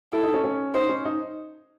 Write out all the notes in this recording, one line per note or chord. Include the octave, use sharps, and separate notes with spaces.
E4 A4
D#4
C#4
C#4
D#4 C5
C#4
D#4